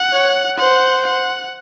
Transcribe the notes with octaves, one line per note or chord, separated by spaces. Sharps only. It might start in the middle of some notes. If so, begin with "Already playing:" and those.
Already playing: F#5
C#5
C5 F#5
F#5